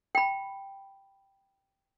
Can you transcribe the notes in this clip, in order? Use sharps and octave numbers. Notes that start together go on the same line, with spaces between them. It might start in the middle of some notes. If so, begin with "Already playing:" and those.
G5 B5